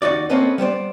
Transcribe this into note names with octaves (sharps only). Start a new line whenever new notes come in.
D#2 D#4 F#4 D5
A#3 C4 C#4 A4 B4 D#5
G3 B3 C5 D5